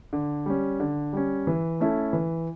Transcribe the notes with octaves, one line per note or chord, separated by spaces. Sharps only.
D3
G3 C#4
D3
G3 C#4
E3
A3 C#4 E4 A4
E3